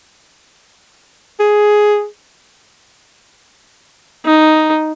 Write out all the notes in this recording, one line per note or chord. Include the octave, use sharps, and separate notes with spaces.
G#4
D#4